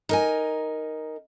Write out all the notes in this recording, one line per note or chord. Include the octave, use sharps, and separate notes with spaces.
D#4 A#4 G#5